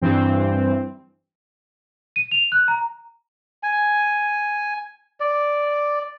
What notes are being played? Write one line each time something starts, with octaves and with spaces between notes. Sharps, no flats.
G2 E3 C4
D#7
F7
F#6
A#5
G#5
D5